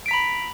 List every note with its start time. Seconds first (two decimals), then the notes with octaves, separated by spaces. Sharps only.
0.06 D7
0.08 B6
0.11 A#5
0.13 B5